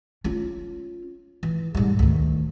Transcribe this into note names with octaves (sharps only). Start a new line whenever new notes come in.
C#4 F4
E3
G#2 G3
D2 D#3